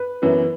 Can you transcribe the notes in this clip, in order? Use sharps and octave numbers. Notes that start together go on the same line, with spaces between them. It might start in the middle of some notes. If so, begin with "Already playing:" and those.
Already playing: B4
F#2 E3 B3